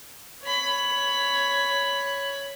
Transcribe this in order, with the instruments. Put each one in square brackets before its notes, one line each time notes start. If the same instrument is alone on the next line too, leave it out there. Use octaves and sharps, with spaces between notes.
[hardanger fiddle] C#5 B5